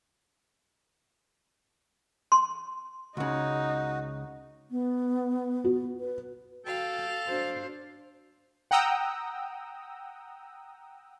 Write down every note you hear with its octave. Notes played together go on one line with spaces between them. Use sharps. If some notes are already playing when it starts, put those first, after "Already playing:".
C6
C#2 C#3 D#4 F#4
B3
F#4
B4
F#4 A4 F5 G5
D4 F#4 C5
F#5 G5 A#5 D#6 E6